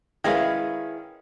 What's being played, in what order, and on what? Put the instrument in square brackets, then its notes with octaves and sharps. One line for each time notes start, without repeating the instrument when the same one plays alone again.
[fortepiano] D#3 G#3 C#4 [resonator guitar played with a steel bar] E4 G#4 B4 [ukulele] D#5 F5